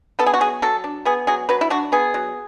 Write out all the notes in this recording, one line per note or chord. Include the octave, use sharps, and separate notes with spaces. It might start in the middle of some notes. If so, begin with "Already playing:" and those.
B3 A4
G#4
F#4
F#3 G#4
F#3 A4
D4
B3 G#4
F#3 G#4
F#3 B4
E4
D4 F#4
B3 G#4
F#3